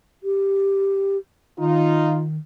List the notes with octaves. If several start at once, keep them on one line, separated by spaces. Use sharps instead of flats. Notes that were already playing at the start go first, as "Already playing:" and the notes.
G4
D#3 D#4 F4